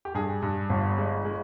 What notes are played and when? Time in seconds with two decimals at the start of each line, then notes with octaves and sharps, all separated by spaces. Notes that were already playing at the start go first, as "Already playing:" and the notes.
0.05 G4
0.14 G2 G#4
0.42 G2
0.70 G1
0.98 G#3
1.25 G#3